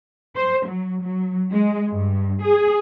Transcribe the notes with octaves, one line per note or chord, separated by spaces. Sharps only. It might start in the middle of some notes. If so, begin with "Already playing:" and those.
C5
F#3
F#3
G#3
G2
G#4